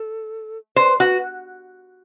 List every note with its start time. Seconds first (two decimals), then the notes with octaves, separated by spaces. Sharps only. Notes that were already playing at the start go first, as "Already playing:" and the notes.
Already playing: A4
0.76 B4 C5
1.00 F#4 B4